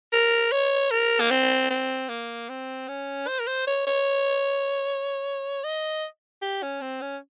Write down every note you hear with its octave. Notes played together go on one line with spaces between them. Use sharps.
A#4
C#5
A#4
A#3
C4
C4
A#3
C4
C#4
C5
A#4
C5
C#5
C#5
D#5
G4
C#4
C4
C#4